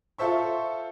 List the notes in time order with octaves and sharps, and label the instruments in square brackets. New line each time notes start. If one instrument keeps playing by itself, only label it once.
[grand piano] F4 A4 C5 E5 C#6